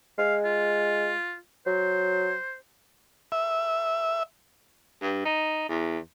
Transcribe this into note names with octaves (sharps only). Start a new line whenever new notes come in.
G#3 F5
F4
F#3 C5
E5
G2
D#4
E2